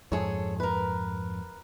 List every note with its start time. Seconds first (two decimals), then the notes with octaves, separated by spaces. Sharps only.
0.12 F2 G#2 G#4 A4 C#5
0.60 A#4 B4